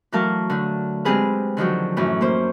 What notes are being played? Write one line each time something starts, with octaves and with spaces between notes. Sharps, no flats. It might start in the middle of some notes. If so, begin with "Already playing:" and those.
E3 F#3 A3 A#4 F5 A5
D3 A3
G#3 C4 G4 G#4 B4 F5
D3 D#3 F3 F#3
F#2 A2 E3
A#3 C5